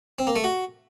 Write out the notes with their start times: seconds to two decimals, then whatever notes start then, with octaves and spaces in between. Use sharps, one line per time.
0.19 C4
0.27 A#3
0.36 A3
0.44 F#4